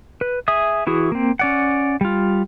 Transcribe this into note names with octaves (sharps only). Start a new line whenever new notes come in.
B4
G#4 E5 D#6
E3 E4 F#4 G#4
A#3 C4
C#4 D5 F#5
G3 F4